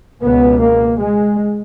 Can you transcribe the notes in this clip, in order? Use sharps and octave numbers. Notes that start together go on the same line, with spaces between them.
C#2 B2 B3
A#3
G#3